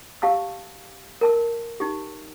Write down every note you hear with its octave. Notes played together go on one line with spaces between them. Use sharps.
G4 F5 A5 E6
A#4 A5 E6
D#4 G4